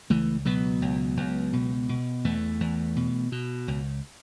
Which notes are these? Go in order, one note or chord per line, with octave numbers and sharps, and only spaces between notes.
C#2 E3 A3
B2 F#3 B3
C#2
C#2
B2
B2
E2 E3 A3
E2
B2
B2
C#2